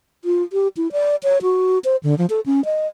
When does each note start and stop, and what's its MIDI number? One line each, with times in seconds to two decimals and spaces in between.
0.25 0.43 65
0.53 0.68 67
0.77 0.91 64
0.92 1.16 74
1.23 1.38 73
1.42 1.79 66
1.84 1.96 72
2.03 2.17 50
2.18 2.26 53
2.30 2.40 69
2.46 2.64 61
2.65 2.87 75